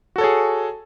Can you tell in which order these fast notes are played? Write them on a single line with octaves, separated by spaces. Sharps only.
F#4 A4 C#5 G#4